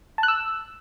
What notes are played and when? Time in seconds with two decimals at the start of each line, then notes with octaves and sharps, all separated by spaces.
0.18 A5
0.23 F#6
0.28 E6